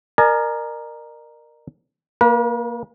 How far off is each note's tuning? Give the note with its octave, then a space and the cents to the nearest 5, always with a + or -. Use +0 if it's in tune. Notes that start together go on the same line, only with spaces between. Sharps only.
A#4 +0 D5 +45 G#5 +35
A#3 +0 B4 -45